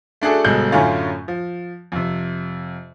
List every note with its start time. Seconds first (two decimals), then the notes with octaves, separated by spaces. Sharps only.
0.22 A3 D4 F#4 G#4 A4
0.44 G1 B2 G#3 A4 F#6 G6
0.72 F#2 A2 D3 A3 C#4 F4
1.28 F3
1.92 F2 C3